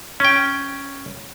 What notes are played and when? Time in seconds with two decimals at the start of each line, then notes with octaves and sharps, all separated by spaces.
0.20 C#4 G5